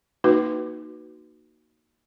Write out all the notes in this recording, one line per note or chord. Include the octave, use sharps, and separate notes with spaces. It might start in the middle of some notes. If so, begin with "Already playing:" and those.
A#3 D#4 F#4 B4